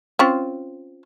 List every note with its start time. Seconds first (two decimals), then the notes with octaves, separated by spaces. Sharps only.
0.19 C4 C#4 F4